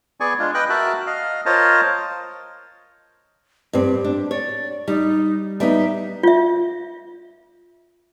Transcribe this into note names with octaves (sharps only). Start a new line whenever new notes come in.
B3 G#4 D5 G#5 C#6
G#3 D4 F4
B4 D#5 G5 F#6
F#4 A#4 E5 A5 F#6
D#5 F5
F4 A#4 C5 C#5 D#5 A5
G2 C4 G4
D4
C#5 D5
G3 D#4
G3 B3 D#4 E5
F4 E5